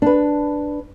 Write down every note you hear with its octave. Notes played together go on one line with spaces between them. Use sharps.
D4 B4